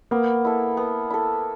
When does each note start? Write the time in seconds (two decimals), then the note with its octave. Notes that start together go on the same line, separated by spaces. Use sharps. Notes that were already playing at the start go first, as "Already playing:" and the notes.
0.11 A#3 B3
0.45 E4 A4
0.77 B3
1.10 E4 A4